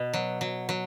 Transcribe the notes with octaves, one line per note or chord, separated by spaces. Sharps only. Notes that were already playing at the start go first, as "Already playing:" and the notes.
Already playing: B2
F#3
F#3
F#3